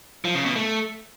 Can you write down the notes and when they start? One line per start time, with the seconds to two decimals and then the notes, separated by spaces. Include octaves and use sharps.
0.25 F3
0.35 C#3
0.45 B2
0.56 A3